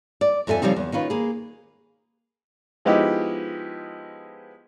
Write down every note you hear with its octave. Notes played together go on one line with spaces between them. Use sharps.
D5
F2 F3 A4 E5 G#5
C#3 F3 G3 C4 D#4
E2
D#3 C#4 F4 B4
A#3 G#4
F3 G#3 B3 D#4 E4 G4